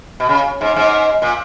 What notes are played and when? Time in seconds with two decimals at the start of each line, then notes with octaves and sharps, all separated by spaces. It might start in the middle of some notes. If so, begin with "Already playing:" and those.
0.20 B2
0.29 C#3
0.61 G#2
0.76 G#2
1.22 A#2